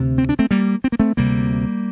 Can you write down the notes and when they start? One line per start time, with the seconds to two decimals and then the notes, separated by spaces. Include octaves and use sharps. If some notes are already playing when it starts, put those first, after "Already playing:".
Already playing: D2 C3
0.18 C4
0.29 D4
0.39 A3 C4
0.51 G3 A#3
0.84 C4
0.92 A#3
0.99 A3 C4
1.17 D2 C3 G3 A#3